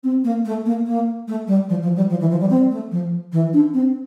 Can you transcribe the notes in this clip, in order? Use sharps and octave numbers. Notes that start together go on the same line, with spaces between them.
C4
A#3
A3
A#3
A#3
A3
G3
F3
F3
G3
F3
E3
F3
G3
C4
A3
F3
E3
D4
C4